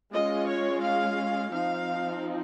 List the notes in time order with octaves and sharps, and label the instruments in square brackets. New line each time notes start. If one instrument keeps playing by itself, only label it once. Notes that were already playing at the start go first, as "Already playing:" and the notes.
[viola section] G#3 C#4 F4 D#5
C#5
F5
F3 C4 D#4 F5